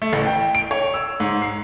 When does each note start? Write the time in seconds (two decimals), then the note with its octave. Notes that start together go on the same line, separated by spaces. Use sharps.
0.02 A3
0.13 A1
0.26 G5
0.55 D7
0.71 C#5
0.94 E6
1.20 G#2
1.42 C7